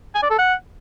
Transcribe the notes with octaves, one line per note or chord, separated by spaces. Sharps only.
G#5
D5
A4
F#5